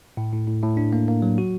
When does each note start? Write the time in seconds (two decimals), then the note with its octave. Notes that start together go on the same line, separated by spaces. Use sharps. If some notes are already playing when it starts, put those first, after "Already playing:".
0.17 A2
0.32 A2
0.47 A2
0.62 A2
0.77 D4
0.93 A#3
1.08 A#3
1.22 F#3
1.38 F#4